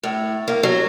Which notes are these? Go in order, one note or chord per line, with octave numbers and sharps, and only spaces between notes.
A2
A#3
F#3